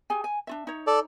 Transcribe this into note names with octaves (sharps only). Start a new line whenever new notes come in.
G4 G#4 G#5
G#5
D4 F4 E5
D#4 C#5
A4 D5